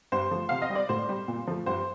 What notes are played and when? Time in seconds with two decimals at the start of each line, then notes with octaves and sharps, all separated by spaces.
0.12 G2 C5
0.31 F3 A3
0.49 C3 F5
0.62 D#5
0.70 G3
0.75 D5
0.89 A2 C5
1.09 G3
1.28 A#2
1.47 F3 A3
1.66 G2 C5